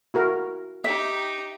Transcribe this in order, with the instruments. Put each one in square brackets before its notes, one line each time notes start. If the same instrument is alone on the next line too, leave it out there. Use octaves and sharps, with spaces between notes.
[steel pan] E4 F#4 A#4
[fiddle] D#4 G4 [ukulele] E5